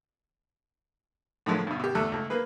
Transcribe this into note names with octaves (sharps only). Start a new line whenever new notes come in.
A2 D3 D#3 F3 F#3 G#3
G2 B2
B2 G4
E2 A3 A4 F#6
C#2 A3
A#3 G#4 B4